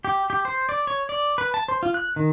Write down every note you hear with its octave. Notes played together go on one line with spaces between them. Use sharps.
G4
G4
C5
D5
C#5
D5
B4
A5
C5
F4
F#6
D#3